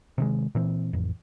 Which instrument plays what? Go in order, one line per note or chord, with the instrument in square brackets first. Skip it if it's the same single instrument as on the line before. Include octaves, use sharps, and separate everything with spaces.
[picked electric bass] C3 D#3 G#3
A#2 E3 C4
A1 F2